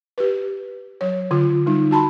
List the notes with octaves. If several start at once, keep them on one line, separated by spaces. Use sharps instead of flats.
G4 B4
F#3 C#5
D3 F4
G3 D#4
F#4 A5 B5 C6